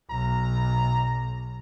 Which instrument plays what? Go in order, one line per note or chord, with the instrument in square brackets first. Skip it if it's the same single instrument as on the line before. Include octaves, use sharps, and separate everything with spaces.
[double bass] B1 [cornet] A#5